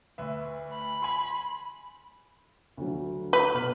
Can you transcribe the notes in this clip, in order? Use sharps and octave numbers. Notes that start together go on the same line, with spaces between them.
D2 B4 E5
B5
G#5 C6
D2 F#3
B4
B2 F6 F#7